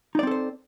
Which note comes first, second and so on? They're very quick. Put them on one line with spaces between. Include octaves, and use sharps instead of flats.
D#4 D5 C4 A4 C5